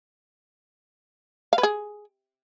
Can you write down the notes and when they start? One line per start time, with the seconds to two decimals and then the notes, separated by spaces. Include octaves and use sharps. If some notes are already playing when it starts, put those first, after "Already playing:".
1.53 F5
1.58 B4
1.63 G#4